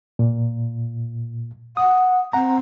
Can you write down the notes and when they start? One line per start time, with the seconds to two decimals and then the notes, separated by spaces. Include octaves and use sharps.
0.19 A#2
1.77 F#5 D#6
2.33 C4 F#5 A#5